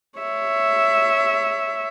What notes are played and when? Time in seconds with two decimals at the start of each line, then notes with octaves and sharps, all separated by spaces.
0.19 C#5 E5